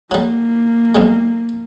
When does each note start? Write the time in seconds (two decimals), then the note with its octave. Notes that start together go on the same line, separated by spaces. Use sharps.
0.11 F#3 G3 A#3
0.95 B1 G3 G#3